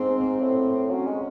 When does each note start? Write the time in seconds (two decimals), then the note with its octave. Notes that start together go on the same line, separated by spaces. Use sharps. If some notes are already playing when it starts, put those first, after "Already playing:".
Already playing: G#2 C4
0.40 A2 C4
0.90 F#3 C#4
1.07 G#3